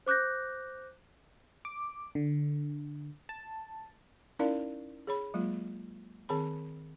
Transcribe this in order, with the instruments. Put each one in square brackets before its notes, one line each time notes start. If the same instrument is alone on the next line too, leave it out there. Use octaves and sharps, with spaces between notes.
[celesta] C5 D6 F#6 G6 A#6
[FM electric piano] D6
D3
A5
[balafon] C#4 D#4 E4 A#4 D5 F5
G#4 C#5 B5
F#3 G#3 A#3 F4
D#3 C4 G#4 C#5 B5